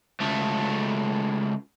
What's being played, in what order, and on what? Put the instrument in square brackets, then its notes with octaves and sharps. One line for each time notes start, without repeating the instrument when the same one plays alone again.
[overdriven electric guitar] C#2 A3